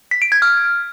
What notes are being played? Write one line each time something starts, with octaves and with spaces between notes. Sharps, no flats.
B6
D7
G#6
F6